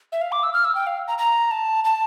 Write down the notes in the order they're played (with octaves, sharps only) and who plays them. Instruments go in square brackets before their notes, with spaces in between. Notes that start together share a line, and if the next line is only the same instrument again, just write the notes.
[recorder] E5
F5
D6
E6
F6
E6
G5
F5
A#5
A#5
A5
A5